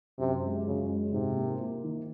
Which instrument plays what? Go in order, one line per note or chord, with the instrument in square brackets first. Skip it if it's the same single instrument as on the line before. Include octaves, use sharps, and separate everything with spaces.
[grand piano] F#2 [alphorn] C3
[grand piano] G#3
[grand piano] F#2 [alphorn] C#3
[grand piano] G#3
[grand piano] G#2 [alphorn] C3
[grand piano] A#3
A#3
D#3